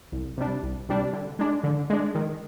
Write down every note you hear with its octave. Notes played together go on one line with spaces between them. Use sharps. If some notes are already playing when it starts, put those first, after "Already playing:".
C2
C3 G3 D4
C2
C3 G3 D4
D3
G#3 D4
D3
G#3 D4
D#3